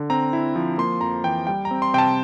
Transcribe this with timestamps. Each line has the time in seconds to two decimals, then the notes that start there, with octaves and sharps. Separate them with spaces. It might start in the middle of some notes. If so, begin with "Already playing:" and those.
Already playing: D3
0.10 C4 A#5
0.33 E4
0.56 F3
0.78 A#3 C6
1.01 F2 A#5
1.24 E3 G5
1.47 G3 G5
1.65 A#5
1.71 C4
1.82 C6
1.94 C3 G5
1.98 A5